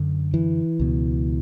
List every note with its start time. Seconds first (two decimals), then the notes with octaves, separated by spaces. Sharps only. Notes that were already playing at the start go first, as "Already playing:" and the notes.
Already playing: F#2 D3
0.34 E3
0.80 C#2 B2